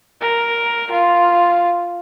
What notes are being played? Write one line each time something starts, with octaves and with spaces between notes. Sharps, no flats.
A#4
F4